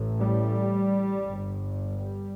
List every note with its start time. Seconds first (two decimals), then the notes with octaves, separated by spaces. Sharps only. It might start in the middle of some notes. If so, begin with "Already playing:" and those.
Already playing: A1 A2
0.21 G3
1.26 G1 G2
1.96 G3